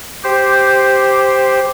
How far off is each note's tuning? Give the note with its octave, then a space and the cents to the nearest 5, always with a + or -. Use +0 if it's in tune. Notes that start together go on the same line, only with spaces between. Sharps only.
G4 +0 C5 +0